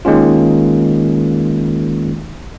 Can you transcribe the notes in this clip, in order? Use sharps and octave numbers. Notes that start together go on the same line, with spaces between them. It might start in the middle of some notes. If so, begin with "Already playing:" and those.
D#3 G#3 A#3 C#4 F4